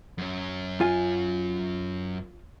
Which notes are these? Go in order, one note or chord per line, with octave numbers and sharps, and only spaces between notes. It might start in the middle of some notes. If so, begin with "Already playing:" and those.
F#2 C#4
F4 G#5